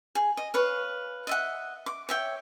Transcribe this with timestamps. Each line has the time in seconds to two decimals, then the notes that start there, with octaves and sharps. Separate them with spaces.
0.15 G#4
0.37 D#5
0.54 B4 C#5 F5
1.27 D#5 E5 F#5
1.86 D6
2.09 C#5 E5 G5